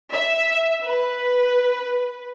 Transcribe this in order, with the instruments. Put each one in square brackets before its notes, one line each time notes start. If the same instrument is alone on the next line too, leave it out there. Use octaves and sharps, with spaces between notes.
[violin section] E5
B4